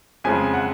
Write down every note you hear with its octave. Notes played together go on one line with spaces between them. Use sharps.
F2 C#3 F3 G#3 G#5
F#5